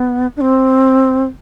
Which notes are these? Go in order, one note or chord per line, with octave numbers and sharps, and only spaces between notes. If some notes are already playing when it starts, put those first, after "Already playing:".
Already playing: B3
D4
C4